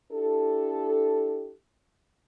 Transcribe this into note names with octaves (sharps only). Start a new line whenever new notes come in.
D4 E4 G4 A4